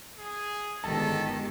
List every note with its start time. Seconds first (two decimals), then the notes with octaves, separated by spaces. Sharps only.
0.18 G#4
0.84 G1 D#3 G#3 B3 G4 A4 A5